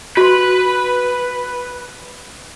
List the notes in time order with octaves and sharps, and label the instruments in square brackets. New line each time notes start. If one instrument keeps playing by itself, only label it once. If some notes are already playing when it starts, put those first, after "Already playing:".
[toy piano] F#4 C6 [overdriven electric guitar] B4